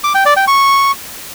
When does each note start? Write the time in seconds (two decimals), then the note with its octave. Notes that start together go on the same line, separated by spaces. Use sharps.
0.04 D6
0.15 G5
0.26 D5
0.36 G5
0.47 C#6